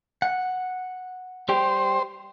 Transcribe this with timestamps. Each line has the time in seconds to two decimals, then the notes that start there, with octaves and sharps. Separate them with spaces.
0.22 F#5
1.49 G3 G4 C5 G5